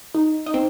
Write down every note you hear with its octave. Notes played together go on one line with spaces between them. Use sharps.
D#4
D#4
C4